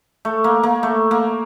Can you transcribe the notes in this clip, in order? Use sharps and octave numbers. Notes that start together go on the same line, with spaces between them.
A3
A#3
A#3
A3
A#3